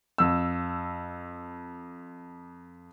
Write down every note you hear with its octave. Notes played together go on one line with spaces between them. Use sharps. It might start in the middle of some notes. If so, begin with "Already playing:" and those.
F2 E6